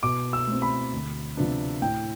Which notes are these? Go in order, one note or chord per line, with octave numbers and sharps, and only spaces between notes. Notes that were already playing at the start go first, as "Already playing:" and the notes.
B2 D6
E6
A3 C4
B5
D2
C3 F3 B3 D4
A2 G5